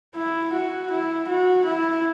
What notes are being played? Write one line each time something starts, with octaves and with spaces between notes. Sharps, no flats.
E4
F#4
E4
F#4
E4